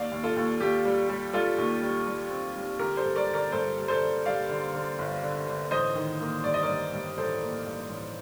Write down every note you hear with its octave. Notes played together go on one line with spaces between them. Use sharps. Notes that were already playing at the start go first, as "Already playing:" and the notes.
Already playing: D#2 D5 F5
D#2
F4 A4
D#2
D#2 G4
G3
G3
G3 F4 A4
D#2
G3
G3
C4
G3
D3 G4 A#4
A4 C5
G2
A#4 D5
D3
A#4 D5
G2 A4 C5
G3
A4 C5
D3
G3 D5 F5
D3
D3
G1
D3
D3
A1 C5 D#5
D#3
A#3
G2 D5
D#5
A#4 D5
G2
G2
A1 A4 C5
A#3
G2
A1